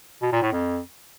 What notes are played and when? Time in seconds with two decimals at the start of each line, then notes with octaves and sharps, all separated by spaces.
0.22 B2
0.32 A#2
0.42 A2
0.52 F2